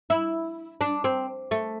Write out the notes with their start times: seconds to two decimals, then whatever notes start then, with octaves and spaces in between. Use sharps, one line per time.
0.10 E4
0.81 D4
1.04 C4
1.51 A3